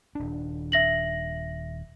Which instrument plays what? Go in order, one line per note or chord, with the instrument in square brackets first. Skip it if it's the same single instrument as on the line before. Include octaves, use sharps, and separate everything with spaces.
[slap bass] D#1 D4
[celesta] E5 A#6 F#7